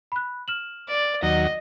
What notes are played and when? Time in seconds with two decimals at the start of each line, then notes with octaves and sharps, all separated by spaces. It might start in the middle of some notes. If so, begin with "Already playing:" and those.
0.12 B5 F#6
0.48 F6 E7 F#7
0.88 D5
1.23 D#2 F#3 D#5